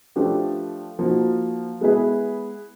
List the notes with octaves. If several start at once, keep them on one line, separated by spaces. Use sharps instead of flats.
F3 A3 D4 G4 B4
F3 A#3 D#4 F#4
G#3 B3 E4 G#4 B4